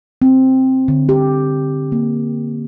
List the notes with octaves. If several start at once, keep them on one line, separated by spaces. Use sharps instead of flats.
C4
D3
G4
A#3